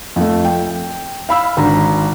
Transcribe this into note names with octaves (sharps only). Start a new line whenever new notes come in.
F2 A3
G5
F5 B5 E6
G#1 D4 A#5